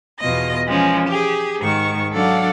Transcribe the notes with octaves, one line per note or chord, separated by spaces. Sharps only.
E2 B2 F4 D#5 A#6
E3 F3 G#3 C#4
G4 G#4
G#2 D#3 C#6
F#3 D4 A4 D5 F5 F#5